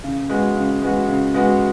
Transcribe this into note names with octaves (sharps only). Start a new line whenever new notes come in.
C#3
G#3 B3 F#4
C#3
G#3 B3 F#4
C#3
G#3 B3 F#4